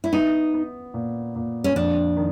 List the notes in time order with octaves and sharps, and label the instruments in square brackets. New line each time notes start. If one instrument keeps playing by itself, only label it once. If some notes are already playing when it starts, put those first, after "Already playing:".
[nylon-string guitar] E4
[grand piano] B3 [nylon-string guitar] D#4
[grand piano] B3
A#2
A#2
[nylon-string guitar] C#4
[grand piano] F2 [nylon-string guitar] D4
[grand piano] D#3